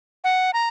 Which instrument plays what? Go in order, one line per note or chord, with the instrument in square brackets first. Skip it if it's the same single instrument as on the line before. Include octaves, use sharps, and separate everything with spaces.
[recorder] F#5
A#5